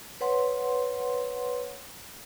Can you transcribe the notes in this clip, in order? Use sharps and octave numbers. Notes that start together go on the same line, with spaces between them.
B4 C#5 F#5 C6